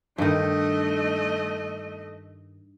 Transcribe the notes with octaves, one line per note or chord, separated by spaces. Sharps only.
G2 D#3 A3 D#5